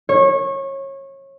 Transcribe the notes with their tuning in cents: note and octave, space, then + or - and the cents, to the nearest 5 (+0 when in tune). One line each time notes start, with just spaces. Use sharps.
C#5 -25